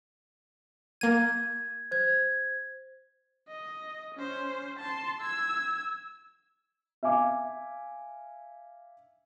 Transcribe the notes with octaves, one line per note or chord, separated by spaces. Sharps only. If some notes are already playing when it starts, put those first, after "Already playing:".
A#3 G#6 D#7
C5 G#6
D#5
C#4 C5
A5 C6
E6 G#6
E5 F5 G#5 D6